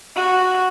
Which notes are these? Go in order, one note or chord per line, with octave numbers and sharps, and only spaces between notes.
F#4